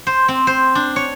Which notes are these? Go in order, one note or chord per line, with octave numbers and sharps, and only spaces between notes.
C5
C4
C5
D4
C#5